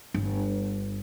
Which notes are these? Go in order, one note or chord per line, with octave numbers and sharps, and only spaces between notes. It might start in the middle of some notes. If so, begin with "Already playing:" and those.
G1